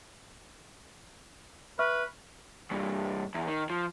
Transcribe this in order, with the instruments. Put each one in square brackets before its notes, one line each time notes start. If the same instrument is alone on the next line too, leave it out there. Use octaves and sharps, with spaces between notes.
[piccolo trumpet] B4 [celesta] E5 C#6 F6
[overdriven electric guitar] C2 G2
E2
D#3
F3